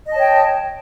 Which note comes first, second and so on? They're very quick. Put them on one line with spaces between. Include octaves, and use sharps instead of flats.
D#5 A5 C#5 G5